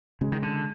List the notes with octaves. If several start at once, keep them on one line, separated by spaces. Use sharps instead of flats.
C#3 G#3
D#3
D3